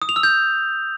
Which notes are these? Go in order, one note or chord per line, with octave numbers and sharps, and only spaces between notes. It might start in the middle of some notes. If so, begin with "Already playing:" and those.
D#6
F7
E6
G6